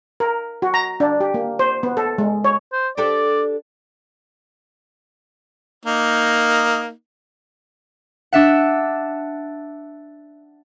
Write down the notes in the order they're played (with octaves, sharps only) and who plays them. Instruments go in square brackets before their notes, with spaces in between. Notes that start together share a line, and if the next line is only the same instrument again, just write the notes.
[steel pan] A#4
F#4
A#5
D4
G4
A#3
C5
B3
A4
G#3
C#5
[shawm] C5
[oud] D4 G4 A4 [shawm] D5
[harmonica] A#3 D#4
[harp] D4 E5 F#5